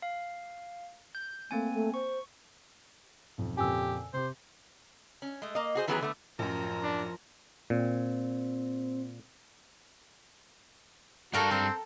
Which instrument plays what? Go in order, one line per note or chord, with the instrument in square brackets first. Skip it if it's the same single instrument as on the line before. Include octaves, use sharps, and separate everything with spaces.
[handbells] F5
G6
[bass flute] A3 [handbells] A#3 C4 G#5
[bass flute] A3
[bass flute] C5 [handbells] C#6
[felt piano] B1 F2
[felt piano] F2 A#2 C#3 [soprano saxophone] G4 [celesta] G#5 E6
[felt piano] C3 G4 [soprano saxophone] C5
[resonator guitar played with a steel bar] C#4
G#3 A3
A#3 D#5
F#4 G#4 C5
D#3 E3 F#3 B3 G4 G#4
D3 A3 B3
[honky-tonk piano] A1 F#2 [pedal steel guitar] F3 [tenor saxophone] A#4
[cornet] D4
[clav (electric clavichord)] A#2 [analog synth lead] C4
[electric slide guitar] G2 D4 F5 [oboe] F#4 [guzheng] A4 A#4 G5
[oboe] C4 [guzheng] A4